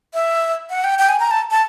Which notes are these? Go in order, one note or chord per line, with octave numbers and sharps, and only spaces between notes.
E5
F#5
G5
G5
G#5
A#5
A5
A5